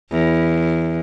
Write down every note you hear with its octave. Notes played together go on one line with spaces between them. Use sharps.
E2